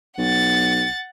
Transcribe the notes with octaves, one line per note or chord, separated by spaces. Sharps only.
B1 F#5 A6